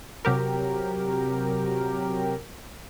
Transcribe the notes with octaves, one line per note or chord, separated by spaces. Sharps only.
C3 F#3 G4 A#4